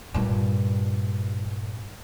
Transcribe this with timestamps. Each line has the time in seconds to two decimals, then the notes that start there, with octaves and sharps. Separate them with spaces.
0.14 G2 A#2